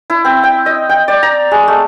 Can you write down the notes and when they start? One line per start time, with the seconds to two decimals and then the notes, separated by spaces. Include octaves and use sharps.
0.10 E4
0.25 C4
0.43 G5
0.66 D#5
0.89 G5
1.08 D5
1.23 A#5
1.51 G#3
1.68 A3